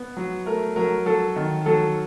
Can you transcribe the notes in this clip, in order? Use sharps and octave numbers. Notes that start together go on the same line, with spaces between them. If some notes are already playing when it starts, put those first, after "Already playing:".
Already playing: B3
F#3
A3 A#4
F#3 A#4
F#3 A4
D#3
F#3 A4